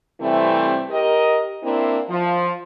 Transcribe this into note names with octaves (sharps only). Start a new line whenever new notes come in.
C3 E3 G3 A3 C4 E4
G4 A#4 D#5
A#3 C4 D4 E4
F3